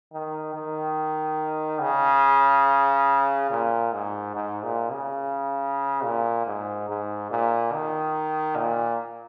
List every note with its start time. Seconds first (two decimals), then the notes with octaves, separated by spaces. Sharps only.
0.13 D#3
0.54 D#3
1.81 C#3
3.51 A#2
3.93 G#2
4.35 G#2
4.63 A#2
4.92 C#3
6.04 A#2
6.47 G#2
6.89 G#2
7.31 A#2
7.73 D#3
8.57 A#2